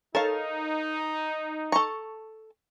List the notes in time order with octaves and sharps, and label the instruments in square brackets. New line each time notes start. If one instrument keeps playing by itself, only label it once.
[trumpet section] D#4 [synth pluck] A4 C#5 [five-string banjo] A#4 F5
[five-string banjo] A4 A#5 [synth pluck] C#6